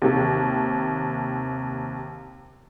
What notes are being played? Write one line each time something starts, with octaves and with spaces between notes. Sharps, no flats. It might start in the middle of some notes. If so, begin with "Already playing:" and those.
D#2 C3